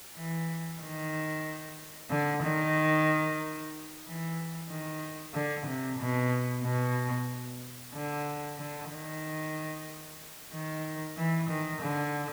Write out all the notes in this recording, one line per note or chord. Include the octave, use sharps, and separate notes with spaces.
E3
D#3
D3
D#3
E3
D#3
D3
C3
B2
B2
D3
D3
D#3
D#3
E3
D#3
D3